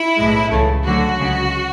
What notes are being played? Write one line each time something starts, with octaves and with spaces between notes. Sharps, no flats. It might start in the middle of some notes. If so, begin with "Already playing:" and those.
Already playing: E4
B1 A2 G#3
C#2 C#3 E3 A3
D2 D3 F#3 A3 F#4
C#2 C#3 G#3